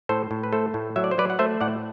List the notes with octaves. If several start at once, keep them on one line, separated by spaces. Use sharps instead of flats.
A2 A4 C5
A2
B4
A3 A4 C5
A2
F#3 E5
D5
C5
F#3 B4 D5
F#5
A3 C5 E5
A2 D5 F#5